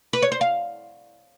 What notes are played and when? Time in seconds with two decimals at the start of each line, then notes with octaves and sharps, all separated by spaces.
0.13 B4
0.22 C#5
0.32 C5
0.41 F5